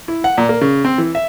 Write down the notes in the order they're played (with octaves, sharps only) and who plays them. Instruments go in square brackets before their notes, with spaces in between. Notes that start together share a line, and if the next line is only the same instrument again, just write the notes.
[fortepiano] E4
F#5
A#2
A#3
C#3
C4
E3
E5